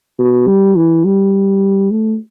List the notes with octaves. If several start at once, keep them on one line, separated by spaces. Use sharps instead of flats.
B2
G3
E3
G3
A3